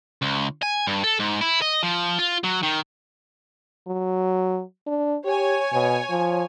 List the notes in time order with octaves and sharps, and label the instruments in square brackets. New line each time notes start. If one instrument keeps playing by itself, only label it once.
[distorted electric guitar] C#2
G#5
G2
A4
G#2
E4
D#5
F3
F4
F#3
D#3
[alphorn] F#3
D4
[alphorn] G4 [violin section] C#5 G#5
[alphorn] B2
F3